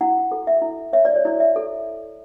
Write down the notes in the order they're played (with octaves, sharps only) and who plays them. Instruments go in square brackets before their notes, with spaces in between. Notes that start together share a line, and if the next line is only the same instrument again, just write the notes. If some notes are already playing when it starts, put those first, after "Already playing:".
[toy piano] E4 F#5
A4
E5
E4
C#5 E5
D5
C#5
E4 D5
E5
A4